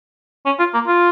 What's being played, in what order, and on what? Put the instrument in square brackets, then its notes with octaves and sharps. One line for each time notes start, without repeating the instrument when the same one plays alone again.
[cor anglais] C#4
F4
A#3
F4